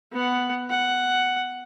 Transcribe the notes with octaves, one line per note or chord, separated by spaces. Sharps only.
B3 F#5
F#5